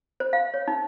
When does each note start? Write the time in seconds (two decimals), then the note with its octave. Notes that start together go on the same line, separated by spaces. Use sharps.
0.20 C5
0.33 F5
0.54 C#5
0.68 D#4